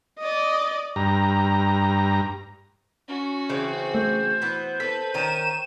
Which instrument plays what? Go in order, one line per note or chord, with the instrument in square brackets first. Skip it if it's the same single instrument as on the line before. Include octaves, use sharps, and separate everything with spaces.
[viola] D5 D#5
[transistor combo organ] G2 A#5
[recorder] C#4 [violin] F#4
[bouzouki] C#3 E3 C4
[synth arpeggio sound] A3 [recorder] C5
[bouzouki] E3 B3
[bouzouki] A4 [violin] B4 [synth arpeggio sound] B6
[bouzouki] D#3 C#4 A#4 [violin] D#7 E7